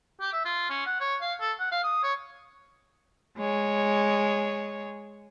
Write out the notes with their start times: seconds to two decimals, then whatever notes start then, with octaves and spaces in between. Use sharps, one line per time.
0.21 G4
0.33 E5
0.45 F4
0.70 C#4
0.86 F#5
1.01 C#5
1.21 F5
1.40 A4
1.60 F#5
1.72 F5
1.83 D#6
2.03 C#5
3.38 G#3 C#5